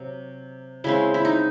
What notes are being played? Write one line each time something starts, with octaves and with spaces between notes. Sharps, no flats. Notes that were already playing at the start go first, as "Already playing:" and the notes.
Already playing: C3 F#3
C#3 G#3 C4 E4
E4
D#4